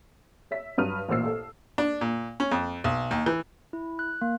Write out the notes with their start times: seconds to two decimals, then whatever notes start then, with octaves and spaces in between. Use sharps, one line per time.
0.51 C#5 E5 B6
0.78 G2 F#3 B4 D#6 F6 D#7
1.09 A1 A#2 C5 E6 C7
1.25 A4
1.78 D4
2.01 A#2
2.40 C#4
2.51 F2
2.84 B1
3.11 D#2
3.26 E3
3.73 E4
3.99 F#6
4.22 A#3